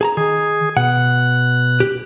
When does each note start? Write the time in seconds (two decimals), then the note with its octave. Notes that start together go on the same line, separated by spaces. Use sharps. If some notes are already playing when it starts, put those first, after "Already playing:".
0.01 G#4 A5 A#5
0.17 D#3 G#4
0.77 B2 F#5 F#6
1.80 G4